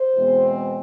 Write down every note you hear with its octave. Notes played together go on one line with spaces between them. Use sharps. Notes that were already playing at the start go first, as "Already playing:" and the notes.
Already playing: C5
E2 B2 G#3 C4